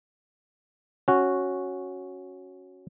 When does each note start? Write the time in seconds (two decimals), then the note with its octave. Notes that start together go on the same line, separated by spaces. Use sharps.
1.08 C#4 F#4